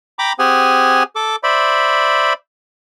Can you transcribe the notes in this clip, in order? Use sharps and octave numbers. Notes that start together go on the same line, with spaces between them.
G5 A#5 B5 D6
C4 G4 G#4 F#5 G#5
A4 D6
C5 D5 E5 B5